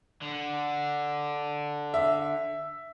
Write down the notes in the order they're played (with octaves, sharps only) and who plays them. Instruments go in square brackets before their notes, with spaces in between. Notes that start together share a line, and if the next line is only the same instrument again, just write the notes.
[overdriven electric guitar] D3
[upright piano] E5